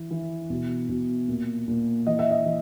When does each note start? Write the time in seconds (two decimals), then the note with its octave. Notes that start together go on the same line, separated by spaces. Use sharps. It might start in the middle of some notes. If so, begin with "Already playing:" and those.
Already playing: E3
0.11 E3
0.50 B2
0.89 B2
1.28 A#2
1.68 A#2
2.07 E3 D#5
2.19 E5
2.31 D#5
2.46 E3